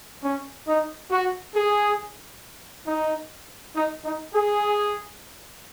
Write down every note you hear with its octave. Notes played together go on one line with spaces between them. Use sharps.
C#4
D#4
F#4
G#4
D#4
D#4
D#4
G#4